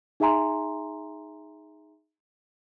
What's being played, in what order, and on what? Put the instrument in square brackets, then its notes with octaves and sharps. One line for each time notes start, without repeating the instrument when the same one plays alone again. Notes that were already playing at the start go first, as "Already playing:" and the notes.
[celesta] D#4 G#4 E5 G#5 A#5 C6